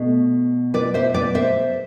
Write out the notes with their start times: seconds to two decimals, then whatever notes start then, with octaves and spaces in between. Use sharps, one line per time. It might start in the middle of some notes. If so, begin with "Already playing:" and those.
Already playing: B2 A3
0.74 B4 D5
0.94 C5 E5
1.14 B4 D5
1.35 C5 E5